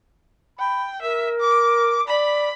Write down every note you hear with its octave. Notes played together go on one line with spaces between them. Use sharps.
G5 B5
A#4 E5
D6
D5 B5